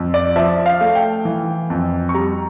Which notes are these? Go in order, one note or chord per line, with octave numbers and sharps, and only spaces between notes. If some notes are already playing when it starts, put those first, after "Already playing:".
Already playing: F2
D5
F3 E5
F5
A3
G5
E3
F2
C#6
G3 A#5